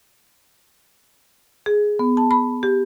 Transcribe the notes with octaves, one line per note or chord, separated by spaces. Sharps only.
G#4
B3
A5
B5
G4